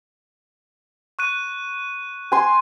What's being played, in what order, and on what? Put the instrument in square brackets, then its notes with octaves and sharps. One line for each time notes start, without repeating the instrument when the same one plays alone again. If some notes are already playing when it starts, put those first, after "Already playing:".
[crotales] C#6 F#6 D#7
[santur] G#5 C6